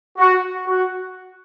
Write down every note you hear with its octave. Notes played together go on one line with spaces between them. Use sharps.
F#4
F#4